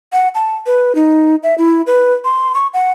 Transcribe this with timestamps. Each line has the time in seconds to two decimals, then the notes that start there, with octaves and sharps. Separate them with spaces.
0.13 F#5
0.35 A5
0.66 B4
0.95 D#4
1.43 E5
1.58 E4
1.87 B4
2.25 C6
2.55 C#6
2.74 F#5